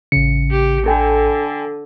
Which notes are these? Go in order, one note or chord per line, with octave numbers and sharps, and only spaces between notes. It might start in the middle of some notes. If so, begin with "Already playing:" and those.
A1 C#3 C#7
G4
D3 A4 G5 G#5